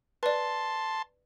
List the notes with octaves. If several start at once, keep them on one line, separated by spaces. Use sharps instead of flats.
B4 D5 A5 C6